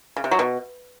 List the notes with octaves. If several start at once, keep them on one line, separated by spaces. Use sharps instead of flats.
C#3
C3
F#3
B2